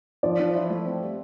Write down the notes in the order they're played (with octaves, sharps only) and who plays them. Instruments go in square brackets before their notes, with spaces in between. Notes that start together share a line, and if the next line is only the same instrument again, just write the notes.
[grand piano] F3 [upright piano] D5
[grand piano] F3
E4
A3
C4
G3